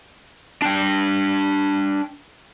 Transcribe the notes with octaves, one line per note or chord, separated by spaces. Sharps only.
D4 G5